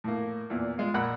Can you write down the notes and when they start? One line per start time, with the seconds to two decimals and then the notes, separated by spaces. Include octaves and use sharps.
0.04 A2 A#3
0.50 E2 A#2
0.78 G#3 F4
0.94 A#1 A#4 F#5 B5 F#6